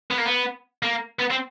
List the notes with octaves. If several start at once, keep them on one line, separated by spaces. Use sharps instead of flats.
B3
A#3
B3
A#3
B3
C4